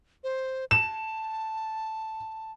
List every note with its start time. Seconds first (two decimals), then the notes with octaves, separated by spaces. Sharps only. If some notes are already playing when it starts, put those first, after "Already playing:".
0.24 C5
0.71 A5 E7